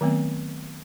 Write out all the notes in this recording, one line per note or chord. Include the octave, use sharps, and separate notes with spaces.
D#3 F#3 A3 B3 C4